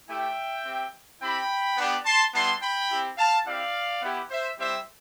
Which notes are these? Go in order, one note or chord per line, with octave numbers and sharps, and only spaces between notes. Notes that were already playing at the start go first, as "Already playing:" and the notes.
A3 E4 G4 E5 G5
C4 G4
C4 E4 G4 G5 B5
B3 D4 G4
A5 C6
G3 B3 E4 A5 C6
G5 B5
C4 E4 G4
F5 A5
C4 E4 G4 D5 F5
B3 E4 G4
C5 E5
G3 C4 E4 G4 C5 E5